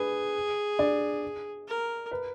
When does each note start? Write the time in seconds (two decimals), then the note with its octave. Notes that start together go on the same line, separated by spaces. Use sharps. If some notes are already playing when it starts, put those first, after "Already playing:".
Already playing: D4 G#4 B4
0.79 D4 D5
1.67 A#4
2.11 B4